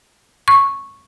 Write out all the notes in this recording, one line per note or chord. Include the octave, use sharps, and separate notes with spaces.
C#6